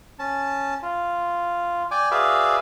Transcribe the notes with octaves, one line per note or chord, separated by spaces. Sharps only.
C#4 A5
F4
D5 G5 G#5 D6
F#4 G#4 B4 D5 E5 F5